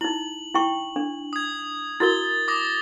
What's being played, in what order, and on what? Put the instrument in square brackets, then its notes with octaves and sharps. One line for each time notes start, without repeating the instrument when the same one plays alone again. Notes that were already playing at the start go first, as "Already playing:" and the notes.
[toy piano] D#4 E4 [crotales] F#7
[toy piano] E4 G5 C#6
D4
[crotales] D#6 G#6
[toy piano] E4 F#4 A#4 [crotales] A6 G7
[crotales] D6 D#6 A#6